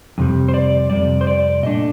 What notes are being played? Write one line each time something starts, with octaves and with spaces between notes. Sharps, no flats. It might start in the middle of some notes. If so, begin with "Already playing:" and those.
F2 C3 G3
C5
D5
F2 C3 G3 D5
C5
D5
A#2 A3 D4 D#5